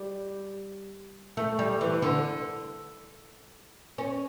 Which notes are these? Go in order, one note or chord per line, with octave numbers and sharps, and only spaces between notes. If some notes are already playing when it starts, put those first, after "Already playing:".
Already playing: G3
A3
G3
E3
D3
C#4